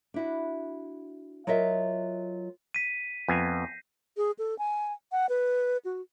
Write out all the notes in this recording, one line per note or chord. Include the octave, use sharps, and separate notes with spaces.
D4 E4 F#4
F#3 F4 A#4 D#5 E5
B6 D#7
F2 B3 G#5 G6 A#6 C7
G#4
A4
G#5
F#5
B4
F#4